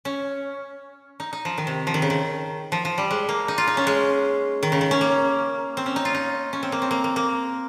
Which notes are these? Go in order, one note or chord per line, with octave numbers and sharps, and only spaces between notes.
C#4
D#4
D#4
F3
D#3
C3
F3
D#3
C#3
D#3
F3
F3
G3
G#3
A#3
D#4
F4
D#4
C#4
G#3
D#3
C#3
D#3
C#4
A#3
C4
C#4
D#4
F4
D#4
C#4
C4
A#3
C4
A#3
A#3
A#3